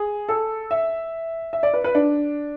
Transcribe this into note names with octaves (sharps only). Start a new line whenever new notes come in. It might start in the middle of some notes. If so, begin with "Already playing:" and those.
Already playing: G#4
A4
E5
E5
D5
B4
B4
D4